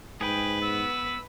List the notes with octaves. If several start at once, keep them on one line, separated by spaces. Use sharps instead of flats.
G#2 G#4 B4 G5
B3 E6